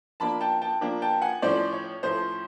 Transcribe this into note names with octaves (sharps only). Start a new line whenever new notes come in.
F3 A#3 D4 A5 B5
G5 A5
G5 A5
F3 A#3 D4
G5 A5
F#5 G#5
A2 F3 A3 C#4 C5 D5
C#5
A2 F3 A3 C#4 C5